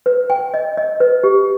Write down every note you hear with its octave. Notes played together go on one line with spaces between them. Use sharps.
B4
G5
D#5
D#5
B4
G4